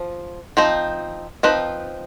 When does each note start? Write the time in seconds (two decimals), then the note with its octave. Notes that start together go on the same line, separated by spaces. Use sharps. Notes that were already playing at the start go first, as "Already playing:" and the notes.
Already playing: F3
0.57 F3 C4 D#4
1.43 F3 C4 D#4 B4